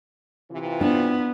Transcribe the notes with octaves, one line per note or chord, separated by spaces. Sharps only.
C3 E3 F4
B3 D4